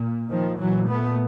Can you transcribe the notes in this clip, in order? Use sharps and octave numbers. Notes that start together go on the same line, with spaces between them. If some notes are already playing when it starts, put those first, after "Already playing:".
Already playing: A#2
D#3 F3
A#2 E3 F#3
A3 B3